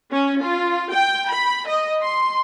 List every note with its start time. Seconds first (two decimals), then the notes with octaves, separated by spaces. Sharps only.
0.12 C#4
0.42 F4
0.92 G5
1.30 B5
1.67 D#5
2.03 C6